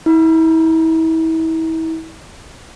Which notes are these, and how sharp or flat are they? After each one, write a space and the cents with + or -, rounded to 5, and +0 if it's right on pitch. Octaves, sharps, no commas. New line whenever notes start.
E4 -35